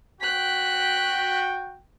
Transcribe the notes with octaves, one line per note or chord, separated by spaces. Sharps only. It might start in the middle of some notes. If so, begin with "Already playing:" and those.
F#4 G5 F#6 B6